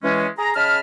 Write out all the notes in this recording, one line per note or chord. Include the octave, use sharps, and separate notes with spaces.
E3 G#3 C#4
G#4 A#5
C#3 D#5 A5 B5 F6